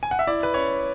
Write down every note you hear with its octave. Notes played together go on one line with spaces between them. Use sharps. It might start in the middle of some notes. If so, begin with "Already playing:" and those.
G#5
F#5
E5
E4 D5
B4
C#4 C#5